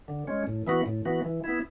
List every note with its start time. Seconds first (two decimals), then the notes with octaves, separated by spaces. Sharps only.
0.08 D3
0.27 G#3 C#4
0.47 A2
0.67 E3 B3 F#4
0.86 A2
1.05 E3 B3 F#4
1.25 E3
1.44 B3 E4